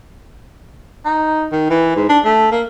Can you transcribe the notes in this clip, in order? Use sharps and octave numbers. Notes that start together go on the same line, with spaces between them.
D#4
D#3
E3
G#2
D4
A3
A#3